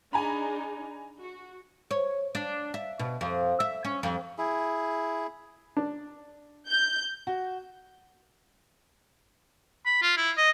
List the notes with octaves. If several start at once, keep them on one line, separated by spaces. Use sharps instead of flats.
D4 D#4 G#4 G#5 A#5 B5
F#4
C#5
D4
E5
B2
F2
E5
C#4
F2
E4 G#4
D4
G6
F#4
B5
F4
E4
D#5